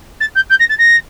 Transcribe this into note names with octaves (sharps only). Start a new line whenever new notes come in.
A6
G6
G6
A#6
A6
A#6